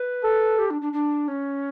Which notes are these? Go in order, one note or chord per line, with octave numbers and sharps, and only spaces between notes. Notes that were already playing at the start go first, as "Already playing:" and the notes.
Already playing: B4
A4
G4
D4
D4
D4
C#4